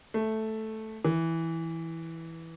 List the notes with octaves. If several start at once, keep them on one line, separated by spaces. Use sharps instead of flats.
A3
E3